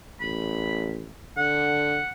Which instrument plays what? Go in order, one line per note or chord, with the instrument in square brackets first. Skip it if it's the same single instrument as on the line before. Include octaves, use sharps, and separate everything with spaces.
[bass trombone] A1 [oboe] B5
[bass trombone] D3 [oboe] F#5